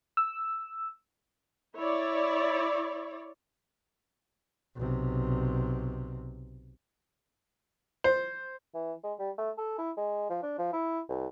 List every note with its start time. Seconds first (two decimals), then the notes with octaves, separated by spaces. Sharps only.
0.17 E6
1.75 E4 C#5 D5
4.76 B1 C3
8.04 C5
8.74 E3
9.04 G#3
9.19 G3
9.38 A3
9.58 A4
9.78 E4
9.97 G#3
10.30 F3
10.43 D4
10.59 F3
10.73 E4
11.09 C2